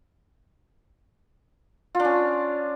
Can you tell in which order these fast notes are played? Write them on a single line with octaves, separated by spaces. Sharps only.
F4 D4 C#4